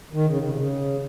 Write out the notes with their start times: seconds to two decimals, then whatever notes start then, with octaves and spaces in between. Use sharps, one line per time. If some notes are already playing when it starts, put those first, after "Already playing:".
0.13 D#3
0.27 C#3
0.42 C#3
0.49 C3
0.57 C#3